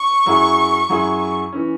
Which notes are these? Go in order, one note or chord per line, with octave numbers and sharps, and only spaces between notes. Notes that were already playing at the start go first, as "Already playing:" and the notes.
Already playing: C#6
F#2 F#3 E4 G#4
F#2 F#3 E4 G#4
E3 C#4